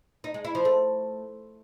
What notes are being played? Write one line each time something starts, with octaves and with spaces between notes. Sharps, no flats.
D#4
G#3
E4
F3
A3